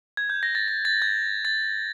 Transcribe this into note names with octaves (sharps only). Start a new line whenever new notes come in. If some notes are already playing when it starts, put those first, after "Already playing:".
G#6
G6
A#6
A6
A6
A6
G#6
A6